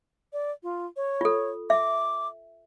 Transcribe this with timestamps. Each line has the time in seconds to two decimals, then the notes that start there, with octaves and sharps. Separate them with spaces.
0.33 D5
0.63 F4
0.96 C#5
1.21 F4 A4
1.70 E5 D6